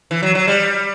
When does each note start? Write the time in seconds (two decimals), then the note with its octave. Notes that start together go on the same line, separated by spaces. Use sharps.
0.11 E3
0.23 F#3
0.35 F#3
0.48 G3